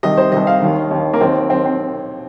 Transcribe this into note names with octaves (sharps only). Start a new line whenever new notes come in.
C2 C3 D#3 D#5
C5
C2 C3 D#3 D#5
F5
D#2 D#3
D#2 D#3
A#3
D#2 D#3 C4
D#2 D#3 C4
C4